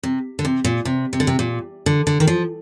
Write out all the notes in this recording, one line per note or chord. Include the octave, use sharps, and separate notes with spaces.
C3
D3
C3
A#2
C3
C3
D3
C3
A#2
D3
D3
D#3
F3